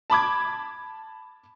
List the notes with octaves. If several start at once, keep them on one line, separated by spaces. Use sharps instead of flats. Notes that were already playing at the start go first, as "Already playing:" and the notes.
A5 B5 D6 G#6